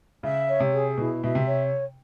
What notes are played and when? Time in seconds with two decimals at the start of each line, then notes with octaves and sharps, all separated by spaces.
0.23 C#3 E5
0.48 C#5
0.60 C3
0.73 G#4
0.98 B2 E4
1.23 B2 E5
1.35 C3
1.48 C#5